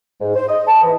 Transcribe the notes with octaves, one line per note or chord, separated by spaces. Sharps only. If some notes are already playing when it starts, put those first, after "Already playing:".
G#2
C5
D#5
A5
E3